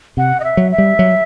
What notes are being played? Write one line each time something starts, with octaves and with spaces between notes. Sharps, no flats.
C3 F#5
D#5
E5
F#3
E5
G3
F#3